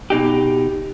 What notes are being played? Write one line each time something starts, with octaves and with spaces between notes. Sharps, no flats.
B2 D#4 G4